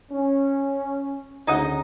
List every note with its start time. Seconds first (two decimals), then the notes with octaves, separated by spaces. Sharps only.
0.11 C#4
1.47 D2 C#3 D#4 D#5 F#5